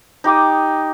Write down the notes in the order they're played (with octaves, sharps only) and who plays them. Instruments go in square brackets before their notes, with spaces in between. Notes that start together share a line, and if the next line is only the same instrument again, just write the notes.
[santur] D#4 G4 D6 D#6